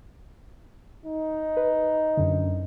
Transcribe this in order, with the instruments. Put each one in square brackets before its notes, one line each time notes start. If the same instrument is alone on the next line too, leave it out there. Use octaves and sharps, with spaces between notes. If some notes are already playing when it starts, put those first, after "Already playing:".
[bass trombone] D#4
[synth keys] B4
F#2 D3